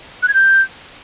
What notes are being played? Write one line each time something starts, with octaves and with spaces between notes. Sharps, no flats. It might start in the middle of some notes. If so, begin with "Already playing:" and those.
F#6
G#6
G6